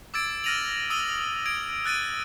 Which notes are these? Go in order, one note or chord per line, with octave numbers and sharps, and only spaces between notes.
D6 E6 G#6 A6 D7
F6 A6 A#6 D#7 F7 F#7
D#6 E6 D#7 F#7 G7
G#6 D7
E6 F#6 A6 D7 D#7